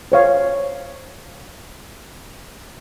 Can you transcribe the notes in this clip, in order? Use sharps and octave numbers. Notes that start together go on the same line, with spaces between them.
C5 C#5 F5